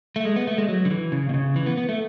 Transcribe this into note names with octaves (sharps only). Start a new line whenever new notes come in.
A3
G#3
B3
A3
G#3
F#3
D3
E3
C#3
B2
C#3
E3
B3
B3
A3